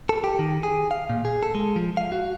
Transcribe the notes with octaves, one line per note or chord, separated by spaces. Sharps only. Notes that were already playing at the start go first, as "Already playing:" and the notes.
A4
G4
D#3
G#4
F5
A#2
G#4
A4
G#3
F3
F5
F#4